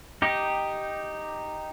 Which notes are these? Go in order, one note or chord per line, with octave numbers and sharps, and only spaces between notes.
D#4 G4